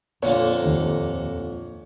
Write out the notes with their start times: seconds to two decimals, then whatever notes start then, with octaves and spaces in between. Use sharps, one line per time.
0.23 F2 A#2 D3 A#3 C#5
0.66 D#2